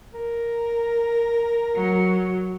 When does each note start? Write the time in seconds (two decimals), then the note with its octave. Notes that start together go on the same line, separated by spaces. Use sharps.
0.14 A#4
1.75 F#3